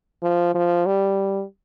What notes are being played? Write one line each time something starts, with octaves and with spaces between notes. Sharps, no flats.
F3
F3
G3